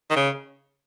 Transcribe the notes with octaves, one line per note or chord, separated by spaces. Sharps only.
D#3
C#3